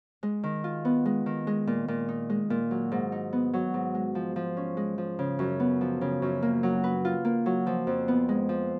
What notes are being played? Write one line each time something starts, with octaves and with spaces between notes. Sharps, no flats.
G#3
D#3
F4
B3
G#3
D#3
G#3
A#2
A#2
D#4
G#3
A#2
F#3
G#2
D#4
B3
F#3
G#2
G#3
F3
F3
C#4
G#3
F3
C#3
F#2
B3
F3
C#3
F#2
A#3
F#3
B4
F4
A#3
F#3
F3
F2
B3
G#3
F3